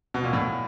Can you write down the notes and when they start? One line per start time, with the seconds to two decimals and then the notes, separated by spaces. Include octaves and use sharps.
0.14 B2
0.24 A#2
0.33 A2